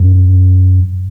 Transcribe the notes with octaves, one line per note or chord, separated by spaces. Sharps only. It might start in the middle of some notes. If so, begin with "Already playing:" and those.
Already playing: F#2